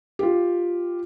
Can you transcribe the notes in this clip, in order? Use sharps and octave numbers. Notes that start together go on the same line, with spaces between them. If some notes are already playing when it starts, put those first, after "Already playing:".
F4 G4